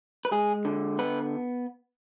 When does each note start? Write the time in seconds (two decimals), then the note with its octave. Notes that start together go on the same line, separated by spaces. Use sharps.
0.25 B4
0.31 G#3 G#4
0.65 D3
0.98 B3 B4